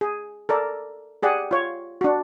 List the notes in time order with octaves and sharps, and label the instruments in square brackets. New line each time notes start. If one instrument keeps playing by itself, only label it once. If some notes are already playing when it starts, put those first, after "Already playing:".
[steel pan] G#4
A4 A#4 D5
G4 G#4 D5 F#5
F4 C#5
D4 F#4